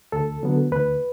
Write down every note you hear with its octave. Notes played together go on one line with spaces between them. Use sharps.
D2 A4
D3 F#3 B3
D2 B4